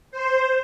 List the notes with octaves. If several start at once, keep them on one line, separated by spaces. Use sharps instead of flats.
C5